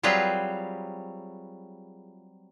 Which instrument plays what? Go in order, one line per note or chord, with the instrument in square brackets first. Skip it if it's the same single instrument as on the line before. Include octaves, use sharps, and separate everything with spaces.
[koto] F#3 G3 C4 F4 G#4 B4